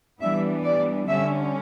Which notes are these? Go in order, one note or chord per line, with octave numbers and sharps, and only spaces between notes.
E3 G3 B3 D4 E5
D5
D3 G3 C#4 E5